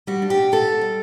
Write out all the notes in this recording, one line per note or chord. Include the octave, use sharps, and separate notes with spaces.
G3 F#4
D4
G4
B2
B2 A4
B2
G3